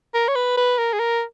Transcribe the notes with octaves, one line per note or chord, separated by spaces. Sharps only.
A#4
C#5
B4
B4
A#4
G#4
A#4